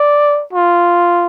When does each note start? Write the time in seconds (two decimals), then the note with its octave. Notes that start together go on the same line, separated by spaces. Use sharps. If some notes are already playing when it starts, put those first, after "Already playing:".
Already playing: D5
0.53 F4